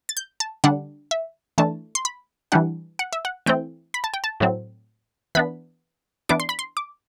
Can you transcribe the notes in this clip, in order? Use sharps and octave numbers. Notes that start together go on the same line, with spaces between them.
A6
G6
A5
D3 G3 D4 F#5
E5
E3 A3 D4 A5
C6
B5
E3 G3 D4 F#5
F#5
E5
F#5
E3 A3 C4 G5
B5
A5
G5
A5
A2 F#3 C4
E3 B3 D4 B5
E3 B3 D4 D6
C6
B5
C6
D6